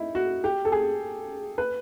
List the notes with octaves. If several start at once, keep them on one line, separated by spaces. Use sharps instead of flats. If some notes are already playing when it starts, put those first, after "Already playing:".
Already playing: D#4 E4
F#4
G4
A4
G#4
B4